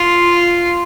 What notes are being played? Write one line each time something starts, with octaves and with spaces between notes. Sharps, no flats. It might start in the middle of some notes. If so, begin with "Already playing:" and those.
Already playing: F4